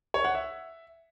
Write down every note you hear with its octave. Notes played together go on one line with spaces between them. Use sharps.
C#5
F#5
E5